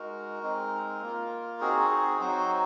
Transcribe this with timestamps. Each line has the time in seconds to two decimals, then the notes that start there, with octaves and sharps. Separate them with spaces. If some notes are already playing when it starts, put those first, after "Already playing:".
Already playing: G#3 D#4 F#4 A#4
0.43 G#3 C4 D#4
1.01 A#3 F4
1.60 C4 D#4 F#4 G#4
1.90 G#4
2.20 F#3 C4 D#4 F#4 C5